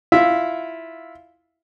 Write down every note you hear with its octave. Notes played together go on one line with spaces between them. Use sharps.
E4 F4 E5